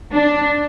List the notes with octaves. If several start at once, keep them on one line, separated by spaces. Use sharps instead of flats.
D4